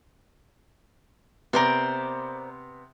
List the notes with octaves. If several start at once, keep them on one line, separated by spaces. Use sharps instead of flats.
C3 B3 A#4 C5 D5